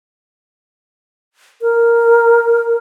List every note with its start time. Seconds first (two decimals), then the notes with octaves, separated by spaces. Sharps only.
1.62 A#4